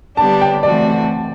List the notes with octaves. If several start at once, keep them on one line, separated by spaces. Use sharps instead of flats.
D3 G3 B3 D4 G4 A5
G5
E3 A3 C4 F#4 A4 D5